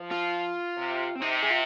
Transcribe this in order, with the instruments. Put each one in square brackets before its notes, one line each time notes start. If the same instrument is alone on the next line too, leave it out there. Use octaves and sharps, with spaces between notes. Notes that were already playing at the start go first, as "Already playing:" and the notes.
Already playing: [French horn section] F3
[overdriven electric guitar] F4
[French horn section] C3
[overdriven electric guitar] C4
[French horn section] C3 [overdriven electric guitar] D#4
[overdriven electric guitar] G#4
F4